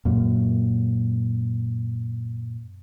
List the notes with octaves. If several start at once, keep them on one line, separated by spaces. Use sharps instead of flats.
F#2 A#2